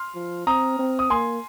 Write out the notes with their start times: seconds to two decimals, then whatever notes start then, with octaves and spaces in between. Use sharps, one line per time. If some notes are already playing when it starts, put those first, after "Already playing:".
Already playing: C6 F6
0.15 F3
0.47 C4 A#5 D#6
0.79 C4
0.99 D#6
1.10 A#3 G#5 C6